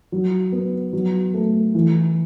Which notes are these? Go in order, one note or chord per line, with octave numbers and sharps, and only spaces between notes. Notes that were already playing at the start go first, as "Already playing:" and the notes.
F#3
B3
F#3
A3
E3